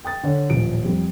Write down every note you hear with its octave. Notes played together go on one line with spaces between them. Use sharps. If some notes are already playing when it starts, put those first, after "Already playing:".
G5 D#6 A6
D3 C#5
D#1 A1 F3 D7
F2 F3 G3 C4